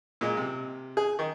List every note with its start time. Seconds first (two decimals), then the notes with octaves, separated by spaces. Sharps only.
0.21 A#2 G#3
0.37 C3
0.97 G#4
1.19 D#3